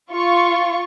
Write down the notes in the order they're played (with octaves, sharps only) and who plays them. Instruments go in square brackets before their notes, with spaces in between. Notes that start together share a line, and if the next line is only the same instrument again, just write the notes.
[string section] F4 C#6